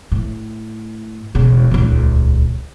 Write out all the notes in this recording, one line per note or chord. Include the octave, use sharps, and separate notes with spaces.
A2
E1 C#3
D#1 C#2